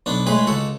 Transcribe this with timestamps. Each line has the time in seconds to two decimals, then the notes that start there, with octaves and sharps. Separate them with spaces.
0.06 B1 B3 D4
0.27 A2 G#3 G#4 B4
0.47 C#2 F#4 A4